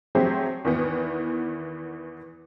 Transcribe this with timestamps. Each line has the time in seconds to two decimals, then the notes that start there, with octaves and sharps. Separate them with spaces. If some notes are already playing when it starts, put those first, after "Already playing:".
0.15 F#3 A3 C4 G4 G#4 C5
0.65 E2 D#3 E3 B3